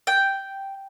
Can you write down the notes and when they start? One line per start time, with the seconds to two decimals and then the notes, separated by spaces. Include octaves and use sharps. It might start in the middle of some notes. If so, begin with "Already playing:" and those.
0.07 G5